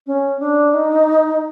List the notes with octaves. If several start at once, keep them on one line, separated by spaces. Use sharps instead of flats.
C#4
D4
D#4